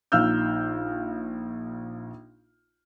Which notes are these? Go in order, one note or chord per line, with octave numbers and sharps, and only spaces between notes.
A#1 D#4 F5 E6 F6 G6